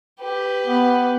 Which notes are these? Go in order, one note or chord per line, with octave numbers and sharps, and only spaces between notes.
G4 B4
B3